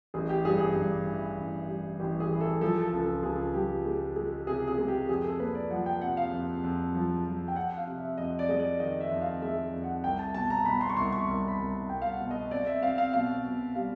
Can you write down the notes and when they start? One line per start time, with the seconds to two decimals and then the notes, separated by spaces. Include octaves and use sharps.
0.14 A1 G#4
0.29 G4
0.45 G2 G#4
0.60 G#4
0.76 G2
1.07 E3
1.37 A1
1.69 G3
2.00 A1 G4
2.20 G#4
2.30 E3
2.41 A4
2.61 F3 A4
2.82 A4
2.93 C#2
3.03 A4
3.23 C#2 G#4
3.54 F3 G4
3.85 G#3
4.16 G#3
4.47 C3 G#4
4.68 G#4
4.78 G#3
4.88 G4
5.09 F2 G#4
5.24 A4
5.39 A#3 B4
5.55 D5
5.71 F3 F#5
5.86 G5
6.01 C3 F#5
6.17 F5
6.33 F2
6.64 F2
6.95 F3
7.25 F3
7.48 G5
7.56 F2 F#5
7.77 F5
7.87 C3
7.98 E5
8.18 F2 D#5
8.39 D5
8.49 G#3 D#5
8.60 D5
8.80 D#3 D#5
9.00 E5
9.11 F2
9.22 F5
9.42 G#3 E5
9.73 F2
9.83 F#5
10.04 C2 G5
10.19 A5
10.35 B2 A5
10.50 A#5
10.65 B2 B5
10.81 C6
10.89 C#6
10.96 C2 C6
11.12 C#6
11.28 C2
11.48 B5
11.59 C2
11.89 C2 G5
12.02 F5
12.10 F#5
12.20 B2
12.31 D#5
12.51 C4 D5
12.67 E5
12.82 C4 F5
12.98 F5
13.13 B2 F5
13.44 B2
13.75 G3 F5